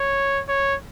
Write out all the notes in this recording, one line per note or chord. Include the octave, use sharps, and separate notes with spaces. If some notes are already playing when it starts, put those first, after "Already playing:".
Already playing: C#5
C#5